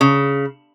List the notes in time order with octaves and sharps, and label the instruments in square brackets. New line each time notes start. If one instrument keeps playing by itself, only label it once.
[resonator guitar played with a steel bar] C#3